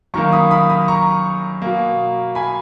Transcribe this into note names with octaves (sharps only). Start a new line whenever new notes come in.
F#2 D#3 A#3 A#5 C#6
B5 D#6
B5 D#6
B5 D#6
A#5 C#6
B2 A#3
G#5 B5